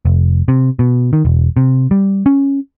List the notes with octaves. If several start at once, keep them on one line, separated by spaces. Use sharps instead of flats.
F1
C3
B2
D#3
E1
C3
G3
C#4